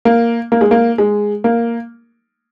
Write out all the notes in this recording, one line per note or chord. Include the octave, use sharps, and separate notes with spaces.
A#3
A#3
G#3
A#3
G#3
A#3